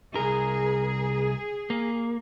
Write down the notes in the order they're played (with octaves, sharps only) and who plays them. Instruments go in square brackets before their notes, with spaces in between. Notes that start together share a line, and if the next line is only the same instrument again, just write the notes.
[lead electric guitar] C2 A#4 [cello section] G#4
[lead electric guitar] A#3